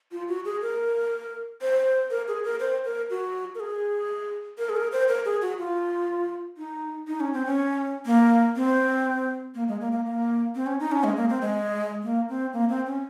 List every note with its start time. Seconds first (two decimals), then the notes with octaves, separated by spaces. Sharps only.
0.12 F4
0.28 F#4
0.45 G#4
0.62 A#4
1.62 C5
2.11 A#4
2.28 G#4
2.44 A#4
2.60 C5
2.85 A#4
3.10 F#4
3.55 A#4
3.60 G#4
4.58 A#4
4.69 G#4
4.76 A#4
4.92 C5
5.09 A#4
5.25 G#4
5.42 F#4
5.59 F4
6.57 D#4
7.07 D#4
7.20 C#4
7.33 C4
7.46 C#4
8.06 A#3
8.56 C4
9.55 A#3
9.68 G#3
9.81 A#3
9.92 A#3
10.06 A#3
10.55 C4
10.67 C#4
10.80 D#4
10.92 C#4
11.04 G#3
11.16 A#3
11.29 C4
11.42 G#3
12.03 A#3
12.29 C4
12.53 A#3
12.69 C4
12.86 C#4